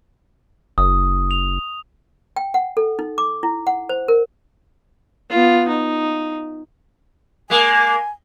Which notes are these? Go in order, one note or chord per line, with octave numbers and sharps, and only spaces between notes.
F#1 D#6
F7
G5
F#5
A4
D#4
D6
E4
F#5
C5
A#4
B3 F4
D#4
G#3 A#3 G#5